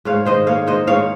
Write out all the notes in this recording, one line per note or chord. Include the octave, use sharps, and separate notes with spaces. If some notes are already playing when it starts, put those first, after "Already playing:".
G#2 C#5 F5
D#3 C5 D#5
A#3 C#5 F5
G#2 C5 D#5
G#2 C#5 F5